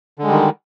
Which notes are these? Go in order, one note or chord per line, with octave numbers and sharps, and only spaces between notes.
D3 D#3 G3 G#3